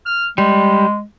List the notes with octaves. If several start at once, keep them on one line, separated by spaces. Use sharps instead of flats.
F6
G3 G#3